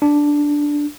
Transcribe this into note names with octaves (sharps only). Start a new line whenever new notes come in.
D4